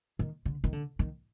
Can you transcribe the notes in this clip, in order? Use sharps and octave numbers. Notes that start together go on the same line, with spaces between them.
D#3
D3
D#3
D3
D#3